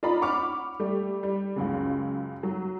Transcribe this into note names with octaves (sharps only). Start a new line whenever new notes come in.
F4 D5 D#5 A#5 B5
F#5 B5 C#6 D6 F6
G3 A3 G4
G3
C#2 F#2 C#3
F#3